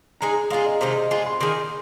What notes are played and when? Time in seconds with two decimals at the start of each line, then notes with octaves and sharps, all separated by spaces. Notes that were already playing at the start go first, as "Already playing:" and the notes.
0.21 G#3 D#4 G#4 A#5
0.50 G#3 F4 G#4 F5
0.65 D#5
0.81 C3 D#3 G#3 D#4 C5
0.95 D#5
1.11 G#3 F4 G#4
1.26 C6
1.40 D#3 A#3 D#4 G#4 C6